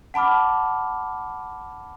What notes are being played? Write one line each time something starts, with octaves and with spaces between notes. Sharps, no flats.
F#5 A5 B5 D6 F6